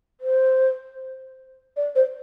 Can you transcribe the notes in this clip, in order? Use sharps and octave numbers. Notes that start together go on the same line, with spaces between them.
C5
D5
C5